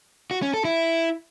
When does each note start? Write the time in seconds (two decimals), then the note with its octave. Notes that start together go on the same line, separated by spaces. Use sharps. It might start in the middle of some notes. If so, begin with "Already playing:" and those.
0.31 F#4
0.42 C#4
0.53 A4
0.65 E4